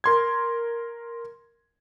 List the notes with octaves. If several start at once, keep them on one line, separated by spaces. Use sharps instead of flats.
A#4 C6 G#6